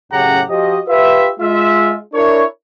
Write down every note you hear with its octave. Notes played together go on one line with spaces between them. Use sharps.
F#2 A2 C#3 G4 F#5 A#5
F3 F#4 G4 D#5
F4 G4 B4 E5
G#3 F4 E5
D4 E4 A#4 C#5